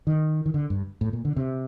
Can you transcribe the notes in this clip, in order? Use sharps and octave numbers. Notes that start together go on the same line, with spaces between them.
D#3
D#3
D3
G2
A2
A#2
D3
C3